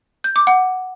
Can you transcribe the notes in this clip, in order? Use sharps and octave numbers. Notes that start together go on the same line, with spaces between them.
G6
D6
F#5